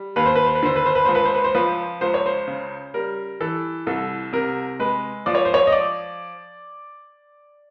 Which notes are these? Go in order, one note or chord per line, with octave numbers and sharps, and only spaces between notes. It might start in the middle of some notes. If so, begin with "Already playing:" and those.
Already playing: G3
D#2 B4
C5
B4
C5
B4
D3 C5
B4
C5
B4
C#2 C5
B4
C5
B4
C5
F3 B4
C#2 C5
C#5
C5
C#3
G3 A#4
E3 A4
C2 A4
C3 A#4
G#3 B4
F3 D5
C#5
C5
C#5
D#5
D5